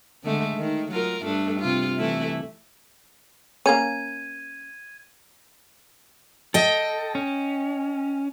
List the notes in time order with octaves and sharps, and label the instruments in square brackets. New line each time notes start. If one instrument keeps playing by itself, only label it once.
[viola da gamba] D3 G#3 A3
D#3
F#3 F4 A#4
G2 A3 D4
C3 F4
E3 A3 E4
[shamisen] A#3 C#4 [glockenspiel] G#6 D#7
[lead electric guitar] A4 [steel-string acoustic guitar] D#5 G5
[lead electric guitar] C#4